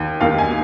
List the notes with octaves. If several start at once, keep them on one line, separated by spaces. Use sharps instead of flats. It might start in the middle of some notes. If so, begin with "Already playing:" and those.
Already playing: D#2
D#2 D#3 F5
G#5